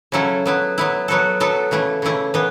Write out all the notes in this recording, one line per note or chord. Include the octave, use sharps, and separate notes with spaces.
C#3 F#3 C#4 E4 A4
F#3 B3 E4
F#3 B3 E4
F#3 B3 F#4 A4
F#3 B3 F#4 A4
C#3 E3 A3 E4
C#3 E3 A3 E4
E3 B3